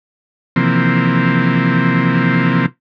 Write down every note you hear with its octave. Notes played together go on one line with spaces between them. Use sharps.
C3 E3 F3 A#3 C4